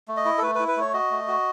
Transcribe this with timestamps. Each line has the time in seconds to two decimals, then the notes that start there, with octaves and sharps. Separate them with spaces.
0.08 A3
0.17 D#5
0.25 E4
0.38 A4
0.42 A3 B4
0.55 B4
0.60 E4
0.68 B4
0.77 A3 C#5
0.93 F#4 D#5
1.11 A3
1.28 F#4